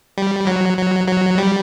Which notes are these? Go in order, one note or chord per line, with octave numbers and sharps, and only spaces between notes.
G3
F#3
F#3
F#3
G3